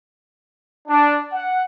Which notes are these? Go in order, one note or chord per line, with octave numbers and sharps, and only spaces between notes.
D4
F#5